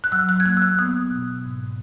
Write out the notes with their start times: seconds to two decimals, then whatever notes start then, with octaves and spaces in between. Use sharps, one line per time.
0.04 F#6
0.12 F#3 E6
0.29 F#6
0.40 G#6
0.45 A#3 F#6
0.57 E6
0.62 F#6
0.78 B3 D#6
1.11 B2
1.44 G#2